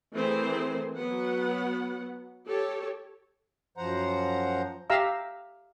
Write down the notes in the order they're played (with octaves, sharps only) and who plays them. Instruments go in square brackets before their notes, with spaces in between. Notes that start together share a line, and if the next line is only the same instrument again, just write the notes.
[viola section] E3 A3 C4 G#4 A#4 C5
F#3 B3 F#5
G4 A4 C#5
[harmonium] F#2 F3 C5 F#5 A#5
[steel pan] G4 E5 F5 A#5 E6